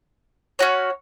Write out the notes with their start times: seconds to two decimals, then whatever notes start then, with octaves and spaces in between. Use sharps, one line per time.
0.59 C#4 F#4 C#5